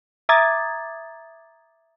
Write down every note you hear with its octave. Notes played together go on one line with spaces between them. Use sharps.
E5 A#5 D6 D#6 G#6 A6